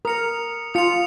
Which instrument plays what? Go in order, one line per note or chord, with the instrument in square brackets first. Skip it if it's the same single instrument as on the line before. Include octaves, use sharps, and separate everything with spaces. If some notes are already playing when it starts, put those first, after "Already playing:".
[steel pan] A#4 [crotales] D#6 C#7 F7
[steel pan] F4 [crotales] D#6 C#7 F7